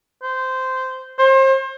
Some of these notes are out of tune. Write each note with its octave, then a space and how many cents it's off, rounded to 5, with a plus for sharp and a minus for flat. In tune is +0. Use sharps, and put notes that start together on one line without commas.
C5 -15
C5 +35